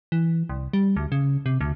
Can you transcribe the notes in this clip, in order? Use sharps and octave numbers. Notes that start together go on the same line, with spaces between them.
E3
C2
G3
D2
C#3
C3
D2